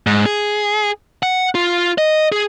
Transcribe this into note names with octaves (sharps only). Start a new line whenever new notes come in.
G#2
G#4
F#5
F4
D#5
G#4